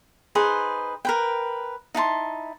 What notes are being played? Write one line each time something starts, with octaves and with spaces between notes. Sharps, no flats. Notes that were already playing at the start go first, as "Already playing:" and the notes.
D#4 G#4 B4 C5
A#4 B4 G5
D#4 E4 A5 C6